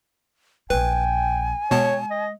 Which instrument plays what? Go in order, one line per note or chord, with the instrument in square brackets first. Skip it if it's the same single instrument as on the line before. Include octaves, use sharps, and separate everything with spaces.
[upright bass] A#1 E4 [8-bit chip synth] B4 [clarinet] G5 [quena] G#5
[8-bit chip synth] B2 B3 A5 [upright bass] G#3 [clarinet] C#5
[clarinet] D#5